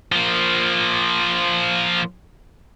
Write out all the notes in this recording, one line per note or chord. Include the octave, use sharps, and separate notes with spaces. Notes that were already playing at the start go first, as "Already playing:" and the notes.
F3 A#3